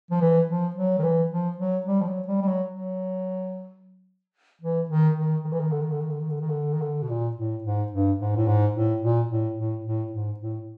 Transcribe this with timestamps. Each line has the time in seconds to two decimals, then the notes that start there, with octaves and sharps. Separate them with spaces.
0.11 F3
0.21 E3
0.49 F3
0.76 F#3
0.99 D#3
1.03 E3
1.30 F3
1.58 F#3
1.86 G3
2.01 F3
2.07 F#3
2.27 G3
2.42 G3
2.48 F#3
2.69 F#3
4.61 E3
4.89 D#3
5.16 D#3
5.44 D#3
5.52 E3
5.60 D#3
5.72 D3
5.82 D#3
5.91 D3
6.01 D#3
6.10 D3
6.20 D#3
6.30 D3
6.41 D#3
6.50 D3
6.73 D#3
6.82 D3
7.03 B2
7.09 A#2
7.37 A2
7.64 G#2
7.92 G2
8.19 G#2
8.36 A2
8.47 G#2
8.75 A2
9.02 A#2
9.30 A2
9.57 A2
9.85 A2
10.12 G#2
10.40 A2